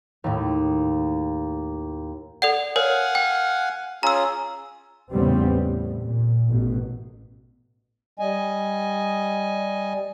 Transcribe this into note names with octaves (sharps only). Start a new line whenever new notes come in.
D#2 A2
A4 D5 F#5
A#4 C#5 F5 F#5 G#5
G5
C#4 F4 G#4 A#5 E6
E2 A2 C#3 G3 B3 C4
A2
A#2
A1 B2
G3 D#5 G#5